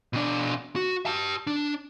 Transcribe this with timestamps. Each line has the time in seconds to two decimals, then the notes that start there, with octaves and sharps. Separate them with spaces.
0.13 B2 D4
0.76 F#4
1.06 G4 A5
1.47 D4